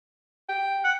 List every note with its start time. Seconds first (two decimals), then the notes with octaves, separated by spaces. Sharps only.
0.49 G5
0.84 F#5